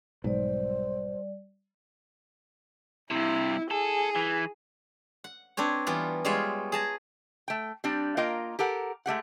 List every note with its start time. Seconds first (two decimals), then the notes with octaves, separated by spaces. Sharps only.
0.24 B1 G#2 G3 C5 D5
3.11 G2 C3 E4
3.71 G#4 A4
4.15 E3
5.24 F#5
5.57 C4 D4 B4 C#5
5.87 E3 G3 B3 F4
6.25 G3 G#3 F4 C#5 E5 F5
6.72 G#4 A5 A#5
7.48 A3 G5
7.84 G3 C4 D4
8.17 A#3 F4 A#4 D#5 G5
8.59 G4 A4 A#4 F#5
9.06 G#3 A3 G4 F#5